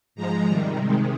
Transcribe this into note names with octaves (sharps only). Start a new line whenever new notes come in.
G#2 F3 G#3 A#5
C3 D#3 G3
C3 D#3 G#3